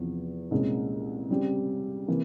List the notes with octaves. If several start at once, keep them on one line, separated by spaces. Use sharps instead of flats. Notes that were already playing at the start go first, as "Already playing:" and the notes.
Already playing: E2 C3 F3
C2 A#2 G#3 C#4
C#3 G3 C4 G4
C3 E3 A#3